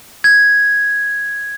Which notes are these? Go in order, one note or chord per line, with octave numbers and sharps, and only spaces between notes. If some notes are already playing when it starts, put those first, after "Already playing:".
G#6